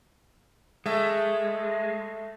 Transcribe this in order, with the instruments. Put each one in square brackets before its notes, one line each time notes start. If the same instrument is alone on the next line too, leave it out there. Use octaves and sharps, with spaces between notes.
[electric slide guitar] G#3 [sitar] A3 E5